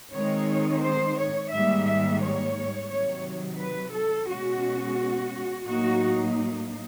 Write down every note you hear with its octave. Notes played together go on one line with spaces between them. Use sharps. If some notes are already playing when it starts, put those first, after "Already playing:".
D#3 G#3 C4 D#4 C#5
C5
C#5
G#2 D#3 G3 A#3 E5
E5
C#5
C3 D#3 F#3 C#5
B4
A4
B2 G#3 C#4 F#4
A2 F#3 A#3 D#4 F#4